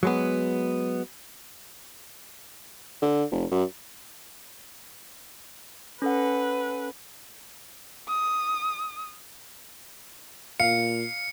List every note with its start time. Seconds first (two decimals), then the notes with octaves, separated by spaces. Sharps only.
0.03 F#3 G#3 B3
3.02 D3
3.32 F1
3.52 F#2
6.02 C#4 A4 B4 F#5
8.09 D#6
10.60 A#2 F5 C#7